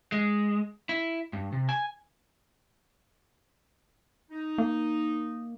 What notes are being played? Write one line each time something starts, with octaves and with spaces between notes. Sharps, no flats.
G#3
E4
G2
C3
G#5
D#4
A#3